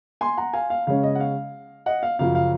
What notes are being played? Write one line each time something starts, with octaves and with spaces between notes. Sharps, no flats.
G#5 C6
F#5 A#5
F5 G#5
F5
C#3 G#3 C#4 F5
D#5
F#5
F5
D#5 F#5
F5
F#2 C#3 F3 F5
F5